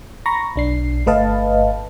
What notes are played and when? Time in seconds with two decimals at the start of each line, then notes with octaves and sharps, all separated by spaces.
0.26 A#5 B5 C#6 A#6
0.56 B1 D4 C7
1.06 G1 A3 B4 D#5 F5 A5